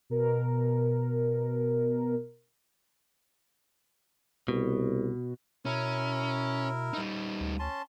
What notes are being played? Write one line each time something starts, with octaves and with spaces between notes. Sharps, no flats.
B2 A#4
C2 B2
B2 C#4 E4 A#4
G3 D#4
D2
C#4 A5 C6